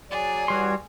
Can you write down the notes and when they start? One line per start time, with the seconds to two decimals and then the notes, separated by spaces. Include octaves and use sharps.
0.11 F#3 G#4 D5
0.48 E3 G3 F#4 C#5 C6